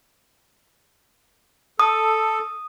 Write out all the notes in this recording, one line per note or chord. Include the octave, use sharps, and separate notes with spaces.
A4 D#6